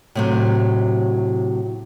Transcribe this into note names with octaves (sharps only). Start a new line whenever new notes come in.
A2 C3 F#3